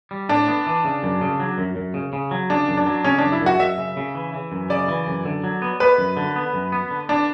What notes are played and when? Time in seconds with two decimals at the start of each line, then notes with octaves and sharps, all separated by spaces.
0.11 G3
0.29 A2 D4
0.48 B3
0.67 E3
0.85 C#3
1.03 F#2
1.21 C#3
1.40 F#3
1.58 F#2
1.76 F#2
1.94 C#3
2.13 C#3
2.31 F#3
2.50 C#3 D4
2.68 F#2
2.77 D4
2.86 F#3
3.04 C#3 C#4
3.18 F#2 D4
3.32 E4
3.41 F#2 F#4
3.59 F#2 E5
3.78 C#3
3.97 C#3
4.15 E3
4.34 E3
4.52 F#2
4.70 C#3 D5
4.88 E3
5.07 F#2
5.25 D3
5.44 F#3
5.62 B3
5.80 B3 B4
5.98 F#2
6.17 D3
6.36 B3
6.54 F#2
6.72 B3
6.91 D3
7.09 B3 D4